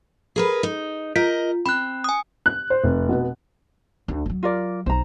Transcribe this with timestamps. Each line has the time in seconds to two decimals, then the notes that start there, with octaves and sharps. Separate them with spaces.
0.36 G#4 A#4 B4
0.63 D#4
1.16 F4 A#4 D#5
1.66 C4 B5 F#6
2.04 G#5 D#6
2.46 F#6
2.70 C5
2.83 F1
3.09 B2
4.08 D2
4.26 F3 F#3
4.43 F4 A#4 D5
4.86 B1 F#3 C5 A#5